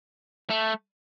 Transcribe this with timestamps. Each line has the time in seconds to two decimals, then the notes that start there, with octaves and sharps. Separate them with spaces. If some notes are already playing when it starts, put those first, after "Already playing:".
0.50 A3